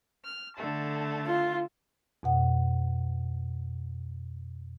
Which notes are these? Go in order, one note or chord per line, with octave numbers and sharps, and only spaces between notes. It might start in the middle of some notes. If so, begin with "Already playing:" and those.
F6
D3 A3 A5
F4
F2 B2 F#5